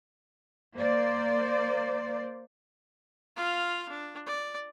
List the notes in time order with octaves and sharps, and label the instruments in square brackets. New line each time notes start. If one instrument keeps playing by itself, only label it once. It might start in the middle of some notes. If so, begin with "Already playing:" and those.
[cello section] A#3 C5 D5
[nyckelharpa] F4 F5
D4
D5